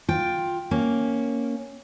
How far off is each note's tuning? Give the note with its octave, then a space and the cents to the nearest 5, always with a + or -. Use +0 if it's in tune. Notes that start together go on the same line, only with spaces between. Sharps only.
F4 +15 G5 +0
A#3 +0 C#4 +0